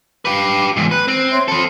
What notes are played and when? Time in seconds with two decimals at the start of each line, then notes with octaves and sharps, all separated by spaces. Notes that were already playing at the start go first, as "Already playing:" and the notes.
0.25 G4 B4 F5 D6
0.76 E2 G#2
0.91 B4 F#6
1.08 C4
1.30 C#5 E5 C6
1.48 C4 A4 B5 C6